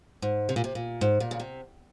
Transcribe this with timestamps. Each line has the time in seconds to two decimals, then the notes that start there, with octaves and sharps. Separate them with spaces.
0.22 G#2
0.49 C3
0.56 A#2
0.64 C3
0.75 A#2
1.01 G#2
1.20 A#2
1.31 C#3
1.40 C3